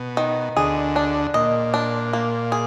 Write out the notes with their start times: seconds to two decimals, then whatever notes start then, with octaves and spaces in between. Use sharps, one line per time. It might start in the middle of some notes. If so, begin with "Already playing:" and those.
Already playing: B2
0.17 D#3
0.57 D2 D3 G#4
0.96 D4
1.34 A#2 D#5
1.74 D4
2.13 A#3
2.52 G#4